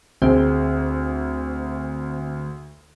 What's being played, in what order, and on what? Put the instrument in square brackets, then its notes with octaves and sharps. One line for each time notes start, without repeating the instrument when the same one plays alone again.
[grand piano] D2 G#4 [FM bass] C4